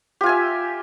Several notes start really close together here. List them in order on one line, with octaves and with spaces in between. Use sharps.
G4 F4 G#5 E5